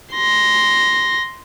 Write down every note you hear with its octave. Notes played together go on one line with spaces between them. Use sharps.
C6 A#6